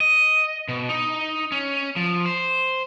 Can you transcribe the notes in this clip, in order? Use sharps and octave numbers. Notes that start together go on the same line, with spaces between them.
D#5
B2
D#4
C#4
F3
C5